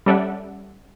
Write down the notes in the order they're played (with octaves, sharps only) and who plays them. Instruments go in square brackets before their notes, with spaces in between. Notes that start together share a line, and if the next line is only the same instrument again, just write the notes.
[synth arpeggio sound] G3 C#4 A4 D5 E5 F#5